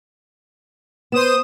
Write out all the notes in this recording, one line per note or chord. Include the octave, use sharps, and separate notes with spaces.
B3 C5 D#6 E7